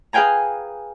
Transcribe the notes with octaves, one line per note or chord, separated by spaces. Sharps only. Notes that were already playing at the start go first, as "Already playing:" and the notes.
G#4 B4 F5 G5 G#5 A#5